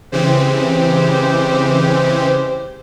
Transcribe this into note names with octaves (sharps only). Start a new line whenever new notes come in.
C#3 E3 G#3 C4 G4 C5